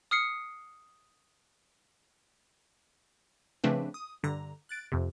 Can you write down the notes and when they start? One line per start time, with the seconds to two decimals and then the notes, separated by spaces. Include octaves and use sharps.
0.11 D#6 F6 C7 C#7
3.64 C#3 F3 A3 C4 D4 B4
3.94 D#6
4.23 G2 D3 A#5
4.69 F#6 A6 D7
4.92 F2 C3